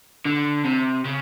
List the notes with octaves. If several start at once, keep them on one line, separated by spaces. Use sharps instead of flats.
D3
C3
C#3